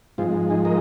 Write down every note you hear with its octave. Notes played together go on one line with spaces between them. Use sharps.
G#2 F3 G#3 C4 F4
D#4 G#4
A#4 D#5